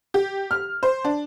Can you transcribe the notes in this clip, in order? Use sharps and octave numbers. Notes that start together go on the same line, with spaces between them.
G4
F6
C5
D4